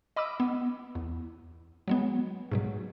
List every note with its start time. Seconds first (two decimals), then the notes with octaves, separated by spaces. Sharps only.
0.16 D#5 B5 D6 E6
0.40 B3
0.95 E2
1.88 F#3 G#3 B3
2.52 G#2 B2 F#3